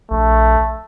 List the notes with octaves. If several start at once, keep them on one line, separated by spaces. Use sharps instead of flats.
A#1 A3